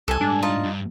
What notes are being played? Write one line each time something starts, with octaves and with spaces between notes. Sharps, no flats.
C2 A4 G#5
G#2 G3 D4
D#4 F4 A5
G2